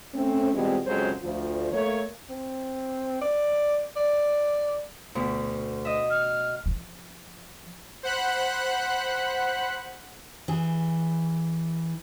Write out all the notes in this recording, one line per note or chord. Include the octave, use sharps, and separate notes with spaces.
A3 C4 C#4
B2 E3 F3 G3 G#3 C4
F2 C#3 F#3 G#3 C5 C#5
D2 F3
A3 A#3 C#5
C4
D5
D5
D2 B2
D#5 E5
F6
F3
C5 F#5 B5 F#6
E3 G#4